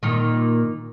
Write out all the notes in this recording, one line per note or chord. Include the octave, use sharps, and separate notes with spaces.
A#2 D#3